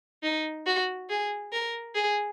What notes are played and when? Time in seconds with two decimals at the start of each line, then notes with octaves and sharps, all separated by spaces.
0.23 D#4
0.66 F#4
1.10 G#4
1.53 A#4
1.95 G#4